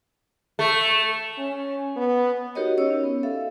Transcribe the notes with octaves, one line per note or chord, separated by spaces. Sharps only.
A3
C#4
B3
D#4 F#4 G4 A#4 C#5 D#5
C#4 C#5 D#5 E6
C#4
B3
A4 E5 F5